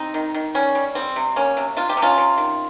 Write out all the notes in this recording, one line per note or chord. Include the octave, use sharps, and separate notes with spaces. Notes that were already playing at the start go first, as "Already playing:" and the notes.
Already playing: C4 D#4
D#3
D#3
G3 C#4
G3
G3 C4
C3
A#3 C#4
C3
C3 F4
G4
C3
C#4 F4
C3
D#3